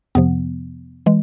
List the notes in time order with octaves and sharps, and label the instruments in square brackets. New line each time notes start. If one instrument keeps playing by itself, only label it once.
[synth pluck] F2 C3 F3 B3
E3 G#3